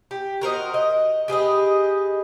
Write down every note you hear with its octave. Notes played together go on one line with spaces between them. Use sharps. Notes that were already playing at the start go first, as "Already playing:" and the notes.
G4
F#4 A#4 C5 D#5
D#5
G4 G#4 B4 D#5